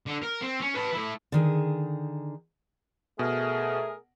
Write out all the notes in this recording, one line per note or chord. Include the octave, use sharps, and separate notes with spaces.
D3
A#4
C4
C#4
B4 A5
A3 E4
D3 D#3 G#4
B2 A3 G#4 A#4